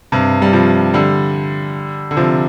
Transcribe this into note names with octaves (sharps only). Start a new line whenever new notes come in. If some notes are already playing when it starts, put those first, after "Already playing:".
G2 C3
G3
C3 F3
D3 G3
D3
C3 F3